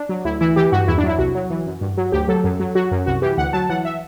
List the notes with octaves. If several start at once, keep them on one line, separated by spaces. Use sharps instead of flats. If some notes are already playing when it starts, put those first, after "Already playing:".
Already playing: D4
F#3
D2 E4
E3 E4
E3 G4
G2 F#4
E2 E4
D4
F#3 E4
C2 F#4
F#3
E3
F#2
G2
F#3
D2 G4
F#3 A4
F#2
F#3
F#3 F#4
F#2
C2 F#4
E3 G4
D2 F#5
F#3 A5
E3 F#5
E5